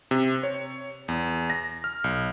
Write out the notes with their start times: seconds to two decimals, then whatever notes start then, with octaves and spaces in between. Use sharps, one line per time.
0.11 C3
0.43 C#5
1.08 E2
1.50 A#6
1.84 F6
2.04 B1